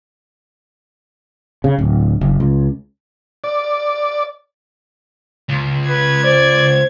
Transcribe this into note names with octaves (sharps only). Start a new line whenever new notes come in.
C#3
D1
F#1
C#2
D5
C#2
B4 G#6
C5 D5